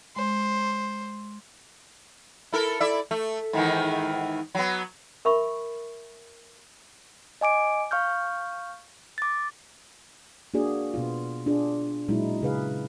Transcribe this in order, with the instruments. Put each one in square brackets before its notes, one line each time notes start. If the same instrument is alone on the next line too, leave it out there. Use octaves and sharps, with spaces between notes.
[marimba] G#3 [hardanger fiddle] C5
[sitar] E4 A4 A#4
E4 D5 E5
A3
G#2 D#3 E3
F#3 B3
[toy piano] A#4 E5 B5 C#6
[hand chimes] D#5 G#5 D6 D7
F5 C#6 F6 G6
D6 A6
[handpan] A#3 D4 F#4 G#4 D5
B2 B3 F4
D4 F4 G#4
A#2 F#3 G#3 D#4 E4
C#3 G#4 B4 F5